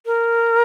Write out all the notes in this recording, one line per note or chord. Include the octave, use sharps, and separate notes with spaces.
A#4